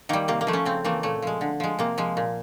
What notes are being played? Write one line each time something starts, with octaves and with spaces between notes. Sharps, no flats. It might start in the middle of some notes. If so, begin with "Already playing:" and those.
D#3 G3 A#3
C3 A#3
A#3
F3 A3
C#4
C#3 C4
E3 A3 A#3
A#2 A3
F3 G#3
D3
F3 G#3
C3 A#3
F3 G#3
A#2